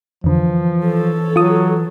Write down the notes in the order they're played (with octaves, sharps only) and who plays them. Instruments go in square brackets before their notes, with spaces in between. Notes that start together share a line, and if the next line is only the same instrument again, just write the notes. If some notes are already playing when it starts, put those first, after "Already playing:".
[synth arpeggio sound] F2 D3 [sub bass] E3 [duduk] F3
[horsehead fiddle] A4 C#5
[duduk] F#3 [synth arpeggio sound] F4 D#6